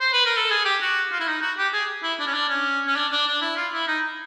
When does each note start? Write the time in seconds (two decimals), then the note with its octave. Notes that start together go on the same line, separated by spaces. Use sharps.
0.00 C5
0.13 B4
0.26 A#4
0.37 A4
0.50 G#4
0.65 G4
0.81 F#4
1.12 F4
1.20 E4
1.27 D#4
1.42 F#4
1.58 G4
1.73 G#4
2.03 E4
2.20 D4
2.27 C#4
2.34 D4
2.49 C#4
2.87 C#4
2.96 D4
3.12 D4
3.27 D4
3.41 E4
3.57 F4
3.73 E4
3.88 D#4